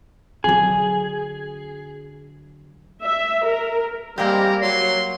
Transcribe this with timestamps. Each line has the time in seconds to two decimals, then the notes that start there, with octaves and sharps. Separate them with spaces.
0.44 D3 F#3 G#4
3.03 E5
3.45 A#4
4.18 G3 G#3 A#3 C4 G4 A#4
4.62 F#3 C#5 C6